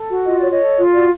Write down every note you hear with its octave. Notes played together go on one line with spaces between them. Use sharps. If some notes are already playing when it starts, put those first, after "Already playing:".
Already playing: A4
F#4
F4 D#5
C#5 D5
C#5 D#5
A4
F4
F#4 D5